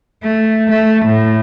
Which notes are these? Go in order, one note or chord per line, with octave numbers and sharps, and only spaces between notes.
A3
A3
A2